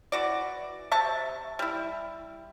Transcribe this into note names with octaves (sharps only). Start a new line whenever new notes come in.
E3 F#4 D5
C3 E5 A5 C#6
G3 E4